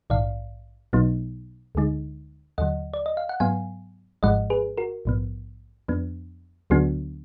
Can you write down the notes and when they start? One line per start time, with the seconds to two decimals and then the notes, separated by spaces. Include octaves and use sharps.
0.10 A#1 G#2 D#3 D5 F5
0.93 B1 B2 F#3 B3 D#4
1.75 D2 D3 G#3 D#4
2.58 D#2 D3 F#3 D#5 F#5
2.94 D5
3.06 D#5
3.17 F5
3.29 F#5
3.40 G#2 F#3 B3 F5 G#5
4.23 G#1 G#2 F3 G#3 D#5 F#5
4.50 G#4 B4
4.78 F#4 A#4
5.05 A#1 G#2 F3 B3
5.88 F2 F3 B3 D4
6.70 D2 D3 F#3 B3 D4 F#4